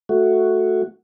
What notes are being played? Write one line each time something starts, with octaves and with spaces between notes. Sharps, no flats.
A3 F#4